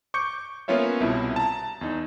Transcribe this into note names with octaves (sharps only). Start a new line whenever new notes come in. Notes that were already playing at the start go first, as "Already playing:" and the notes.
C#6 D6 G6 C#7
A#3 B3 C#4 F4 C#5 E5
C2 B2 E4
A5 A#5
E2 D#4